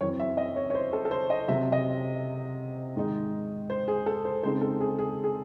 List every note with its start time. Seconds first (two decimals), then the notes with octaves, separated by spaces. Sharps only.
0.01 F#2 E3 C4 C#5
0.20 E5
0.37 D#5
0.56 C#5
0.70 C#5
0.75 C5
0.93 A4
1.05 A4
1.11 C5
1.30 D#5
1.48 C3 F#3 C4 E5
1.72 D#5
2.96 G#2 D#3 G#3 D#4
3.70 C5
3.88 G#4
4.06 A4
4.25 C5
4.43 C#3 G#3 C4 D#4 C5
4.61 A4
4.80 G#4
4.99 G#4
5.24 G#4